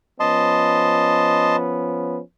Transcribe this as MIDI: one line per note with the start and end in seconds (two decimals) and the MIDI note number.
0.20 2.19 53
0.20 2.19 59
0.20 2.19 61
0.20 1.56 75
0.20 1.56 81
0.20 1.56 84